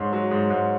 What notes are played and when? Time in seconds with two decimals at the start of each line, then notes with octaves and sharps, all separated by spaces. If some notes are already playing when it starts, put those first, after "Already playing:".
Already playing: G#2 C#4 C6
0.12 F#3
0.31 G#2
0.50 G#2